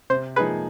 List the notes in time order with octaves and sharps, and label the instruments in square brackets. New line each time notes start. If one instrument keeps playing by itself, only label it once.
[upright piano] C3 [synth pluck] C5
[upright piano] F3 A#3 D#4 G#4 [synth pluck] B4